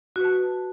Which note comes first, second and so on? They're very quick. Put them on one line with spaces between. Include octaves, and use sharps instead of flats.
F#4 B4 A5